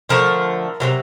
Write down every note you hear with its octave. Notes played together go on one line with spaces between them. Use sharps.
D3 F3 A3 A#4
C3 D#3 F#3